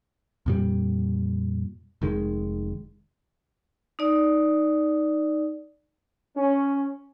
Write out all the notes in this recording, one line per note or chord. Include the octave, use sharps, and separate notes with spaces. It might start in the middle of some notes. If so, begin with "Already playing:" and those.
F2 A#2 G3
F1 D#3 G#3
D#4 D5
C#4